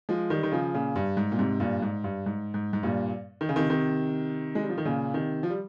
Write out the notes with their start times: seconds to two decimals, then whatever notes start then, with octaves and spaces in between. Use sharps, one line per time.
0.09 F3 G#3
0.30 D#3 G3
0.43 D#3
0.52 C#3 F3
0.74 A#2 C#3
0.96 G2
1.17 G#2
1.32 A#2
1.39 G#2 C3
1.60 G2 A#2
1.82 G#2
2.04 G2
2.26 G#2
2.54 G#2
2.73 G#2
2.83 G2 A#2
3.41 D#3
3.49 C#3
3.56 C3 D#3
3.70 C3 D#3
4.55 G#3
4.62 G3
4.69 F3
4.78 D#3
4.85 A#2 C#3
5.14 C3 D#3
5.43 F3
5.50 G3